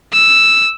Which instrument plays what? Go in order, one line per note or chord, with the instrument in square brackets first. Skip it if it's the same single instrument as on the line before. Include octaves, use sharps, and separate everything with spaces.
[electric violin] E6